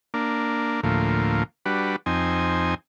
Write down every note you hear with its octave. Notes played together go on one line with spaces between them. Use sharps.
A#3 D4
D2 A2 F3 A#3
G3 D4 F#4 B4
F2 C4 D#4 G#5